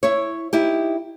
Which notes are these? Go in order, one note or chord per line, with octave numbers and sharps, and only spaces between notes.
E4 C#5
D#4 E4 G4